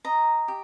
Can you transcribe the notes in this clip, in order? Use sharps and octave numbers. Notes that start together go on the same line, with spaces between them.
D#5 A#5
G4